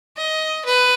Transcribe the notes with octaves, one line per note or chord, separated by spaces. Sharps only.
D#5
B4